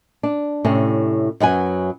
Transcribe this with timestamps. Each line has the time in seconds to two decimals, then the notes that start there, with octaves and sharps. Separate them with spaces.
0.23 D4
0.65 A2 C3 C#4
1.40 F#2 F#3 B4 G#5